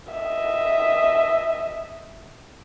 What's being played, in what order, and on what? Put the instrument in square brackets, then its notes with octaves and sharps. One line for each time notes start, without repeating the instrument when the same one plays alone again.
[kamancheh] D#5 E5